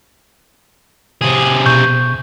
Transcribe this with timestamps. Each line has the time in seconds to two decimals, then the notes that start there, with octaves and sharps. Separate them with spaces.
1.21 C3 G#4
1.66 B2 C#6 G6